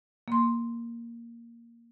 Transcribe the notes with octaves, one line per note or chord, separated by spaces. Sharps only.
A#3 C6